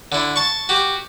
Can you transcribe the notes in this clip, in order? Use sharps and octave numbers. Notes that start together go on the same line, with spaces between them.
D3 E4
A5 C#6
F#4 G4